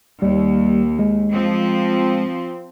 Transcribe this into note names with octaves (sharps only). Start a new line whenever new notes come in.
D#2 G3
G#3
F3 C4